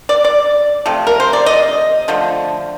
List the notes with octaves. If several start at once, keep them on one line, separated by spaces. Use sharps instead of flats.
D5
D5
C3 F3 A3
A#4
C5
D5
D#5
D3 F3 A3